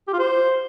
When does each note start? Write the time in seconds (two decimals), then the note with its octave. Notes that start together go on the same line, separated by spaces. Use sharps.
0.08 G4
0.13 F4
0.19 C5